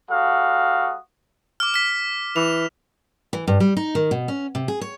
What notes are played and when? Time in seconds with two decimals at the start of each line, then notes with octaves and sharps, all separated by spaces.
0.10 G3 F#4 A4 F5 D#6
1.60 D6 F6
1.74 F6 B6
2.36 E3 F7
3.33 E3
3.47 G2
3.60 G3
3.77 D#4
3.95 D#3
4.11 B2
4.28 C#4
4.55 C3
4.68 G#4
4.81 C#5